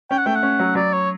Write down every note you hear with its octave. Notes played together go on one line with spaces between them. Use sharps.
C#4 G5
F#5
A3 G5
F#5
C#4
F#3
F#3 D5
C#5